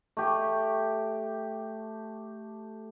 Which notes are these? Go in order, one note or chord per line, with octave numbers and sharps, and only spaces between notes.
A3 G4